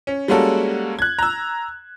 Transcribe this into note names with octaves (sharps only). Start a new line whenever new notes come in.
C#4
G3 G#3 A#3 C#4 F#4 A4
F#6 G#6
A#5 E6